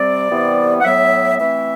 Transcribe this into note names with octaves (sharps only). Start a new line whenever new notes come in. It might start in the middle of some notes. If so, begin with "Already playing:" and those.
Already playing: C3 G3 C4 D5
C3 E3 G3 B3
F#5
A2 F#3 B3 E5
E3 A3 C4 E5